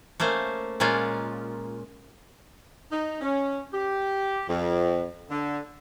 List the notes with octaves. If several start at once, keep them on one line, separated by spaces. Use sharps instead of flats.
A3 A#3 C#4 C5
A#2 G#3 A#3 C#4 F4
D#4
C#4
G4
F2
D3